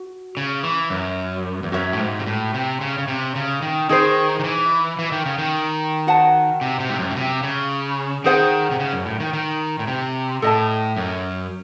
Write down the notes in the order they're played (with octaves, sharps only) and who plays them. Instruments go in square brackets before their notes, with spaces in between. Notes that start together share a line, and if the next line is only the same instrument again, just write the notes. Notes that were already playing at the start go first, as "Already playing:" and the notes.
Already playing: [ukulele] F#4
[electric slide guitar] C#3
E3
F#2
E2
[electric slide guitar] F#2 [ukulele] F#4 C#5 E5
[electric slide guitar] A2
G#2
C3
A2
C3
C#3
C#3
C3
C#3
D#3
[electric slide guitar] D#3 [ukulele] D#4 G#4 C5
[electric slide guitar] D#3
E3
E3
D#3
C#3
D#3
[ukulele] F#4 C5 F#5 A5
[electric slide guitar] C3
C3
G#2
F#2
A2
C3
C#3
[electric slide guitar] D#3 [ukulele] G#4 C5 F#5
[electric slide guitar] C3
C#3
F#2
A2
D#3
D#3
A2
C3
[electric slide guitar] A2 [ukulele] A4 D#5 A5
[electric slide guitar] F#2